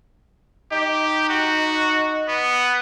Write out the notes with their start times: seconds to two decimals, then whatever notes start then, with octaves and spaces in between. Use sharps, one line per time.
0.72 D#4 G4
1.29 F#4
2.29 B3